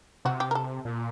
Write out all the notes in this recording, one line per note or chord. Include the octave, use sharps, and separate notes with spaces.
C3 F#4
G4
A#4
A4
A#2